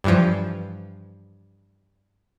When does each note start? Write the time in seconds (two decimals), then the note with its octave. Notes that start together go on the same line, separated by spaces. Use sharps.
0.04 G2 E3 F3